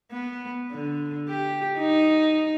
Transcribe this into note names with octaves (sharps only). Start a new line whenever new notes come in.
B3
D3
G4
D#4